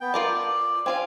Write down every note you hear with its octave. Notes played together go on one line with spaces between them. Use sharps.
B3 G5
F4 A#4 D5 A5
D5
C4 F4 F5 G#5